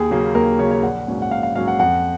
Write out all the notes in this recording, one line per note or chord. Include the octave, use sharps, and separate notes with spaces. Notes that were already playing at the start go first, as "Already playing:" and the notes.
Already playing: D#2 G#4
C#3 F#3 A#3
D#2 A#4
C#3 F#3 A#3 C#5
C#5
A#1 F#5
G#2 F#3 A#3 C#4
F#5
A#1 F5
F5
G#2 F#3 A#3 C#4 F5
F#5
F2 F#5